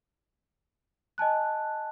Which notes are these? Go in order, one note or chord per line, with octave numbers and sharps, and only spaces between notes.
D#5 G#5 A5 F#6